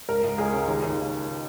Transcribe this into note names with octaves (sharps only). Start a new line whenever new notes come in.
C#2 A#4
C#2
C#2 G#4
C#3
D#2
D#2